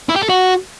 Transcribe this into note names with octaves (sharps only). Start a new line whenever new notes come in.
E4
G4
A4
F#4